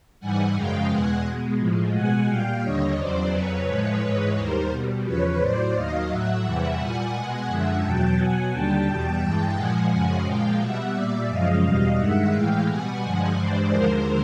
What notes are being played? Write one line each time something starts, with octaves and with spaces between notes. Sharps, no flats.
G#2 E3 G3 F#5 G#5
F#2 C#3 F3 G#3 F5 G5
E2 B2 G#3 F#5 G#5
B2 G#3
A2 F3 G#3
B2 G#3 F#5 G#5
A#2 G3 F5 G5
D#2 D3 G3 C#5 D#5
E2 C#3 F#3 C5 D5
F2 C#3 F#3 B4 C#5
A2 F3 G#3
G#2 E3 G#3
D#2 D#3 G3 A#4 C5
B2 G3
E2 C#3 F3 B4 C#5
A2 F#3 C5 D5
D#2 D#3 F#3 D#5 F5
A2 F#3 E5 F#5
E2 C3 E3 G3
A#2 G3 F#5 G#5
B2 G#3
F#2 D3 F3 G#3 E5 F#5
E2 B2 F#3 G5 A5
B2 F#3 F#5 G#5
D#2 D3 G3 G5 A5
E2 B2 G3
G2 E3 G#3
A#2 F3 G#3 F#5 G#5
F#2 C#3 F3 G#3 F#5 G#5
A#2 F3 G#3 F5 G5
B2 G3 E5 F#5
A#2 G3 D5 E5
F#2 C#3 F3 G#3 D#5 F5
E2 B2 G3 D#5 F5
G2 D#3 G#3 E5 F#5
A2 E3 G#3 F5 G5
B2 G3 F#5 G#5
G2 D3 F3 G#3
G2 E3 G#3 C5 D5
D#2 D3 F3 G#3 A#4 C5